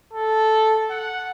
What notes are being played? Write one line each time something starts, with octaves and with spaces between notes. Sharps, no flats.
A4
F#5